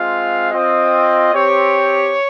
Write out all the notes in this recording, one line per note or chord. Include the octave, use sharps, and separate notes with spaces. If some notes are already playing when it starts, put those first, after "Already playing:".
Already playing: G#3 C4 F4 F5
C4 F4 D#5
C4 G4 C#5